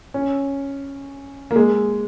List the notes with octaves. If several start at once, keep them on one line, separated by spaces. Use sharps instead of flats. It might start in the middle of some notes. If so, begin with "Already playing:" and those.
C#4
A#3
G#3